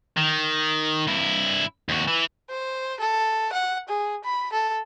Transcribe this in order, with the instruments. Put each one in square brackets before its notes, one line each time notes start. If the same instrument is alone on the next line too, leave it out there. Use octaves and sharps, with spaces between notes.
[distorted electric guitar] D#3
G2 E4
D#2 F#4
E3
[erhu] C5
A4
F#5
G#4
B5
A4